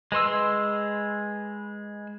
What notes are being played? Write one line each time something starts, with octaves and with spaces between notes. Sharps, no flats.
G#3 B4 C6 E6